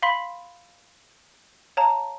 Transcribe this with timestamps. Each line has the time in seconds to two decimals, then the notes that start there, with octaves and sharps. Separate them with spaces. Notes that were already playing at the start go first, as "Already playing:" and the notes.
0.02 F5 B5 C6 B6 F#7
1.77 C#5 F5 A5 A#5